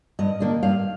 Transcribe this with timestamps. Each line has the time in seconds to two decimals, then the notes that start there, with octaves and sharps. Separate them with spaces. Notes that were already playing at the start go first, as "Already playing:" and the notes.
0.19 G2 D#5
0.40 D#3 A#3 D4
0.63 G2 F5